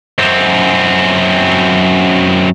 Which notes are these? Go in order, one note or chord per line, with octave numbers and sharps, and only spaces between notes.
F#2 C4